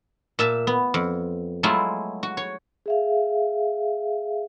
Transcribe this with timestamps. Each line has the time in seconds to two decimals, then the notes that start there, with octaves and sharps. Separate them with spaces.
0.39 A#2 E5 A5
0.67 B3
0.94 F2
1.63 F#3 G#3 A3 E4 F4
2.23 F#4
2.37 C#5
2.86 G#4 E5 F5